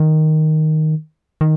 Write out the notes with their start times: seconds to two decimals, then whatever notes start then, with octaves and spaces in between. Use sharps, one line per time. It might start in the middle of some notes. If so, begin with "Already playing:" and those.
Already playing: D#3
1.41 D#3